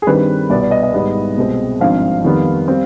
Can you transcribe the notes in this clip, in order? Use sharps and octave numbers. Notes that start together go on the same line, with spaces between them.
G#4
G2 D#3 G3 C4 B4
C2 B2 B3 D5
D5
D#5
D#5
G#1 G#2 G3 B3
C2 B2 G#3 C4
G#1 G2 F3 C4 F5
F2 D#3 G3 B3
G3 C4